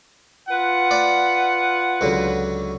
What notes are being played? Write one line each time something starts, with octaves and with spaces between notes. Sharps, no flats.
F4 B4 F#5
D5 B5
C#2 D3 F#3